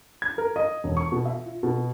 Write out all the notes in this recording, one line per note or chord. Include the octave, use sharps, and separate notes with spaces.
G#6
A#4
D#5
E1
C#6
B2
E5
F4
B2